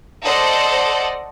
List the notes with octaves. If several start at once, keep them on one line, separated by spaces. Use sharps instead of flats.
A4 C5 D5 D#5 F#5